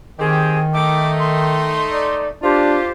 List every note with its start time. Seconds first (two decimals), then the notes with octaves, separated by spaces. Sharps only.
0.19 D#3 C4 G4 G#4
0.73 A3 D#4 D6
1.19 C6
1.93 D5
2.43 D4 F4 G4 C5